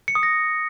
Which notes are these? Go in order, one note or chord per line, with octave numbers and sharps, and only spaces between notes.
C#7
D#6
A#6